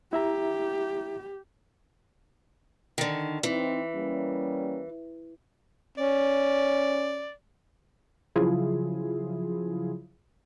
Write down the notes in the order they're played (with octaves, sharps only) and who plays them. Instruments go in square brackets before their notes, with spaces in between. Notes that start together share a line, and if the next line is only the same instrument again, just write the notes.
[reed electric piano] E4 E5 A#5 [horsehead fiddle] G4
[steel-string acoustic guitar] D3 D#3
[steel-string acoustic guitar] E3 [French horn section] C4 D#4 E4
[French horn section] G3 A#3 C#4
[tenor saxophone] C#4 [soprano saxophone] D5
[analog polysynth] C#3 F3 F#3 E4 F4 G#4